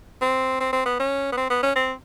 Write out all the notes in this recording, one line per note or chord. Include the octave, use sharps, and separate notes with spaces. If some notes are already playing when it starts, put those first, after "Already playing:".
C4
C4
C4
B3
C#4
B3
C4
B3
C#4
C4